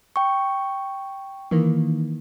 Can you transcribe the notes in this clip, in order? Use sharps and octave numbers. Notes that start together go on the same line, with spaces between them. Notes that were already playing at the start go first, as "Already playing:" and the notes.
G5 C#6
D#3 E3 A#3